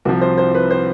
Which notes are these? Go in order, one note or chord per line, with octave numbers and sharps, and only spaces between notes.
C2 C3 F3 F#4
C5
C5
B4
C5